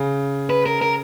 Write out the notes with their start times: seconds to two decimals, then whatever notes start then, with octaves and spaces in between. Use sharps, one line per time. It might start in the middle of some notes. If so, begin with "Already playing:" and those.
Already playing: C#3
0.50 B4
0.66 A#4
0.81 A#4